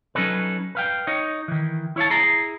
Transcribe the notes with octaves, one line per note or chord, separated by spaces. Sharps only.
F#3 C#4 D#4 A4 B4
B4 F5 G5
D#4 C#5 D#5
D#3 E3
E4 C#5 F5 A5
E4 G#4 A#5